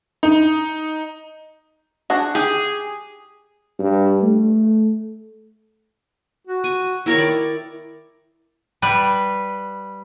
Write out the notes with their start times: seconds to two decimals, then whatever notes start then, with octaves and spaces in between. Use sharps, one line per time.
0.23 D#4
2.10 D4 F#4 G#4
2.35 G4 G#4
3.79 G2
4.22 A3
6.47 F#4
6.64 G#5
7.06 D#3 E4 A#4 C#5
7.18 D5
8.82 G3 B4